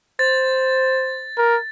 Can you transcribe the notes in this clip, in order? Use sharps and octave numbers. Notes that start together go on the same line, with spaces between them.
C5 A6
A#4